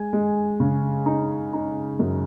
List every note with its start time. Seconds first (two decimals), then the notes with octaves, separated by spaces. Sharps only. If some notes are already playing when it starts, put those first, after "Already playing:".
Already playing: G#3 G#5
0.13 G#3
0.60 C#3
1.06 D#4
1.53 D#4
1.99 F#2